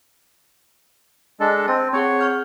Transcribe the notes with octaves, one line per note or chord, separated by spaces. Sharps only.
G#3 D4 A4
C4 A5
C4 G#4 C#5 F#5
C#6 F6 G6